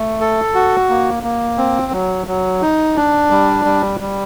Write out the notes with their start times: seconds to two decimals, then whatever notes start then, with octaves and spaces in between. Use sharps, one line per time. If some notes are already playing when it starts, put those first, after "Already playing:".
Already playing: A3
0.21 A4
0.54 F#4
0.89 A#3
1.23 A#3
1.58 C4
1.92 F#3
2.27 F#3
2.62 D#4
2.96 D4
3.30 G3
3.65 G3
4.00 G3